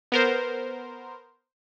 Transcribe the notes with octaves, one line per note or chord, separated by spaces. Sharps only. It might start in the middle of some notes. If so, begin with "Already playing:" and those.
B3 A#4 C5